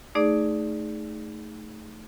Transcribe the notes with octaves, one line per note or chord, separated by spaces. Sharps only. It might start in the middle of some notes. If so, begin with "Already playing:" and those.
A3 D#4 G#4 D5 D6